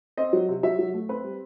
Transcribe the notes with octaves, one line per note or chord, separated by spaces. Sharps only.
C4 D#5
F#3
C3
F#3 E5
F#3
A3
C4 B4
G3